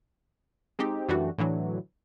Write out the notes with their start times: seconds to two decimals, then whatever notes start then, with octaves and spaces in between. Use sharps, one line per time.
0.79 G#3 C4 D#4 G4
1.09 F#2 E3 G3 A3 D4 F#4
1.38 A2 D3 E3 F#3